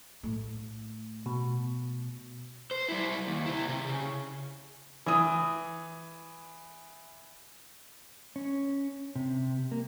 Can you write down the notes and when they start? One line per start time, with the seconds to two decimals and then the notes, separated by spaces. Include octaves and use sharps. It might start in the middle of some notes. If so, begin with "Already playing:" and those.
0.23 A2 A3
1.26 B2
2.71 C5
2.89 G3 E4
3.27 D#2
3.46 C3 E4
3.69 C3
3.87 C#3
5.06 E3 D#6
8.36 C#4
9.16 C3
9.72 A#3